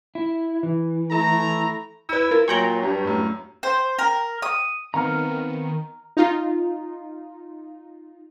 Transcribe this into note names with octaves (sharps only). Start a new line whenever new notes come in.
E4
E3
A3 E4 A#5
E4 B4 E6
F4 A#4
A#2 F#3 C#5 G5 A#5 F#7 G7
G2
F#2 A2
C5
A#4
D#6
D#3 B3 C4 F5 A#5 F6
D#4 F4